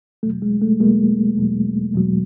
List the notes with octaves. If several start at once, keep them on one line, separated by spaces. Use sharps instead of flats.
E2 B2 F#3 A3
G#3
A3
E2 B2 F#3 G#3 A#3
E2 B2 F#3
E2 B2 F#3